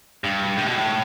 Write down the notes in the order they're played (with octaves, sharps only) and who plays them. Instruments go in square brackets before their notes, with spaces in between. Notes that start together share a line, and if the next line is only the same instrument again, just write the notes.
[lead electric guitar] G2
A2
B2
A2